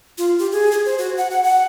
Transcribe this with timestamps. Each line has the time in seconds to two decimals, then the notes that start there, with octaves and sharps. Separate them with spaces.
0.18 F4
0.39 G4
0.52 G#4
0.72 G#4
0.85 C5
0.98 F#4
1.17 F#5
1.30 F#5
1.44 F#5